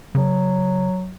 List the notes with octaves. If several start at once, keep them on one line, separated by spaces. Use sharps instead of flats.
C#3 F#3